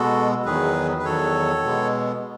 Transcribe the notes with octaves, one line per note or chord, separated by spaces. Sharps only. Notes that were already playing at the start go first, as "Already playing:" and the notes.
Already playing: B2 G#3 B3 F#4 A4
E2 D#3 F#3 G#4 B4
B4
E2 D#3 F#3 A4 C#5
B2 G#3 B3